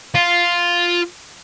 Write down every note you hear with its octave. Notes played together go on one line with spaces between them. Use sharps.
F4